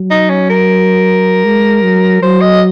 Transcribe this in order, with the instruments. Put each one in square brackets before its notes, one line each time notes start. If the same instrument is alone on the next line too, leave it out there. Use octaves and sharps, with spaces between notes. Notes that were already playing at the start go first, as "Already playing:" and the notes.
Already playing: [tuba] F#3
[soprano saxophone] D#4
C#4
A#4
[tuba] G#3
F#3
[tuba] F#3 [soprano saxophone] C5
[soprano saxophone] D#5